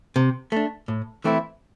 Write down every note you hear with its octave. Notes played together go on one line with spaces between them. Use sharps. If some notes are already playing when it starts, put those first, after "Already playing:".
C3
A3 D4
A2
E3 A3 C4 E4